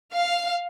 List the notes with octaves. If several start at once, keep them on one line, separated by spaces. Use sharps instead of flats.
F5